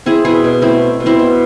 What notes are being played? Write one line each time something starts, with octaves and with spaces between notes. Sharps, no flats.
C4 E4 G#4
B2 E4 G#4
B2
A3 C4 E4
C4
B2
C4 E4
B2